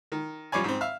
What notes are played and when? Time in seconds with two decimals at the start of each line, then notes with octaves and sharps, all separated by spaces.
0.12 D#3
0.52 F#2 F3 G3 C#5 D5 G#5
0.64 G#2 C4
0.81 E5 F5